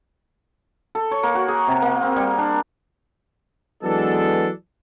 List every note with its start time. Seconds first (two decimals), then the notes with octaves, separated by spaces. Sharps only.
0.95 A4
1.11 C#5
1.23 A#3
1.35 F#4
1.48 G#4
1.68 C3
1.82 A#3
2.02 C4
2.16 G3
2.38 D4
3.83 E3 F#3 G#3 B3 D4 A4